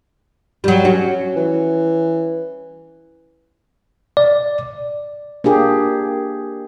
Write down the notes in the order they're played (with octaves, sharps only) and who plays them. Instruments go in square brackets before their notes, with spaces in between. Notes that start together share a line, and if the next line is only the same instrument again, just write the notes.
[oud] F#3 G3
C#4 F#4
[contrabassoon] E3
[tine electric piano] D5
[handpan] A#3 D4 G4 G#4